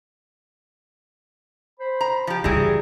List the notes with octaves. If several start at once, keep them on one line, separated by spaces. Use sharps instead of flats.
C5 B5
A#5
F3 G4
G2 C#3 E3 F#3 G3 G#4